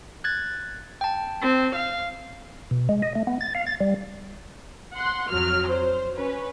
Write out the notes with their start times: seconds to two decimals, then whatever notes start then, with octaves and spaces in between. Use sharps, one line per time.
0.24 F#6 G#6 A6
1.01 G5 A5
1.42 C4
1.75 F5
2.71 B2
2.89 G#3
3.02 D#5
3.15 A3
3.27 B3
3.41 A6
3.55 F5
3.67 A6
3.81 G3
4.95 F#5 C6
5.30 F2 F#3 F6
5.69 C5
6.14 C#4 B4